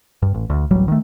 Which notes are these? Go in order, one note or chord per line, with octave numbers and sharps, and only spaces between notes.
G2
A1
D2
D1 A1 F#3 G3
D#3 A3